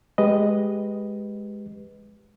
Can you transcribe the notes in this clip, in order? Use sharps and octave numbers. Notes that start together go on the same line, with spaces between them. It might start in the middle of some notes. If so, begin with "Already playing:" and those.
G#3 G4 B4 D#5